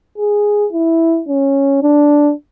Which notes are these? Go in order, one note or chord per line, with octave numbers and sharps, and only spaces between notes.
G#4
E4
C#4
D4